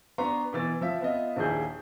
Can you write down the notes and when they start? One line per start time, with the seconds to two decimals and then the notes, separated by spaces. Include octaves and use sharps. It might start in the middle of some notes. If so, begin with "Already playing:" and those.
0.18 B3 D4 A#5 C6 C#6
0.53 B2 E3 A6
0.81 F3 E5
1.02 B3 F4 D#5 E5
1.36 A#1 D#2 E4 G#4 G6